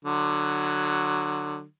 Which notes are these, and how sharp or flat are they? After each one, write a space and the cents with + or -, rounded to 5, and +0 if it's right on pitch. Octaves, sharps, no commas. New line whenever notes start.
D3 +20 F#3 +0